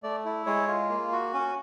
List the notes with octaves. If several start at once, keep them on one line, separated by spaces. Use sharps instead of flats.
A3 D5
E4
G#3 C#5
F4
A#3
F#4
C#4